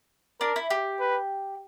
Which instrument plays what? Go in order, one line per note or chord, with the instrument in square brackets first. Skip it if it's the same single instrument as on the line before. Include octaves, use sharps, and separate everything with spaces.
[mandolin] D4 [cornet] A#4
[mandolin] E4
G4
[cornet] B4